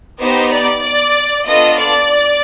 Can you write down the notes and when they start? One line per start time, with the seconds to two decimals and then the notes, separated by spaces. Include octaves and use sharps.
0.20 B3 D#4 G4 C5
0.52 D5
0.83 D5
1.46 B3 D4 F4 A4 D#5
1.78 D5